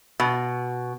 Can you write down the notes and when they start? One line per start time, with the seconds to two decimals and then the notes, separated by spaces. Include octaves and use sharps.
0.20 B2